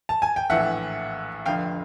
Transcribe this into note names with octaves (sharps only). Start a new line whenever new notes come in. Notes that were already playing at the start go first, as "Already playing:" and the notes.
A5
G#5
G5
A#1 A2 E3 E5 F#5
F1 F2 D3 F5 G5